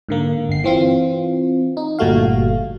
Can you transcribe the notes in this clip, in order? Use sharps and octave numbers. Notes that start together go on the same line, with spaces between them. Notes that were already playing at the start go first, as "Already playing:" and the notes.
G#2 D3 A#3
G1 C7
E3 C4 F4
D#4
G1 A#2 G3 A3 F#4 F5